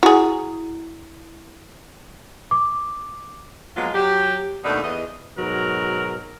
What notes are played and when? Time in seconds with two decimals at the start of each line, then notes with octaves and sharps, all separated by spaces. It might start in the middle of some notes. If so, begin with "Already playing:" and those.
0.03 E4 F#4 G#4
2.51 D6
3.77 F3 F#3 G#3 A#3 B3 F4
3.94 F#3 G4
4.64 D#2 B2 A3 D4 D#4
4.82 E2 D#5
5.37 G#2 B2 F#3 A#4